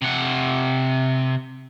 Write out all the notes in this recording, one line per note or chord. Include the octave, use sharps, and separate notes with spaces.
C3 F#5